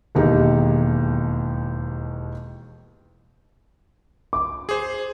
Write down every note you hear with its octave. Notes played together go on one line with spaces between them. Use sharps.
E1 D#2 D#4 G4 G#4
D6
G#4 C5